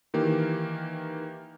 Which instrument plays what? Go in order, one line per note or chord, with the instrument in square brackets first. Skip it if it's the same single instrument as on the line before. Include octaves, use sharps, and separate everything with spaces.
[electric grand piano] D#3 E3 A#3 G4